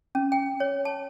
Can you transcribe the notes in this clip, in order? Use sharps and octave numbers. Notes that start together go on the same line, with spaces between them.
C#4
G5
C#5
A5